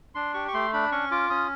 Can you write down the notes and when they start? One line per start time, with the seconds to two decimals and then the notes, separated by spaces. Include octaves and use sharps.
0.15 D4 C6
0.34 G4 C#6
0.48 C#6
0.54 A3 C6
0.73 D4 B5
0.92 C#4 C#6
1.11 F4 D6
1.30 C#4 D#6